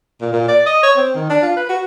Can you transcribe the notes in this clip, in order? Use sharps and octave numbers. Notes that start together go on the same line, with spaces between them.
A#2
A#2
D5
D#5
C#5
C4
D#3
D4
F4
B4
F#4